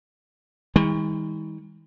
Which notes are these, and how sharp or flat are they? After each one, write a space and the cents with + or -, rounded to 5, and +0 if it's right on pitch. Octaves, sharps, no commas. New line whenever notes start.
D#3 +45 G#3 -45